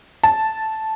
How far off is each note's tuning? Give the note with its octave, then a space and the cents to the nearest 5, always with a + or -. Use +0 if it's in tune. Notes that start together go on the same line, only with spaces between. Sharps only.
A5 -5